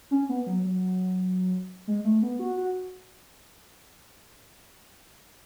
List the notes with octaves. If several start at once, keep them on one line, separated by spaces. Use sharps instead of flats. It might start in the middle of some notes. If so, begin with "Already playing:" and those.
C#4
B3
F#3
F#3
G#3
A3
B3
F#4
F#4